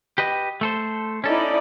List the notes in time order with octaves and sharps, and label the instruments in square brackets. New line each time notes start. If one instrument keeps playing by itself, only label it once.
[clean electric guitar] G4 B4 D#5
A3 A4 C5
[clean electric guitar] C#4 A4 [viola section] D#4 E4 D5